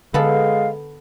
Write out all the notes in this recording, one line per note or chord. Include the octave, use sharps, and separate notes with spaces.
D3 G#3 B3 A4 F5